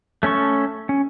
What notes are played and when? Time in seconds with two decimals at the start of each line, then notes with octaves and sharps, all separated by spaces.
0.23 A3 C#4 A4 C#6
0.89 C#4